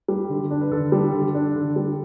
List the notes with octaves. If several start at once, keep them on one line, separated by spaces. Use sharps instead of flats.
G3
D3
D4
B4
D3 A4
G3
D3
D4
D3
G3